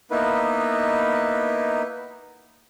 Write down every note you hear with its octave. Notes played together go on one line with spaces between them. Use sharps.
A#3 B3 D#4 E4 B4